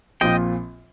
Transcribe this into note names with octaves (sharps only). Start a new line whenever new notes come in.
A#1 A#2 F3 C4 F4 D#5 G5